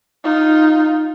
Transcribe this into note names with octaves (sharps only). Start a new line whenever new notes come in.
D#4 F4